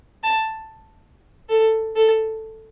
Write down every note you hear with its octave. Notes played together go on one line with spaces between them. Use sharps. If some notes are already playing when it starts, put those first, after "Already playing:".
A5
A4
A4